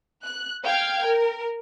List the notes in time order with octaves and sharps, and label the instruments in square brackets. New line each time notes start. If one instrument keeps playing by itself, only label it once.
[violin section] F#6
F5 G5 F6 G#6
A#4